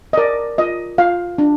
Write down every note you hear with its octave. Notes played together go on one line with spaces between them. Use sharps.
D#5
A#4 D5
F4 D#5
F4 F5
D4